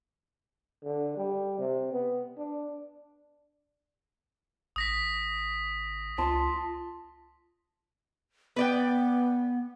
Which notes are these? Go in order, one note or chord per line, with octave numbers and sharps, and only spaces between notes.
D3
G3
C3
B3
D4
G#1 D#6 A#6 B6
C#2 F4 A5 C6
B3 B4 D5 G5